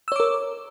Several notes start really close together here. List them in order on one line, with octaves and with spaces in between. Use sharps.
E6 C#5 D6 A#4